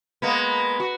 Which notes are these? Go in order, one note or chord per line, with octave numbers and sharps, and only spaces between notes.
G#3 A#3 B3
F#4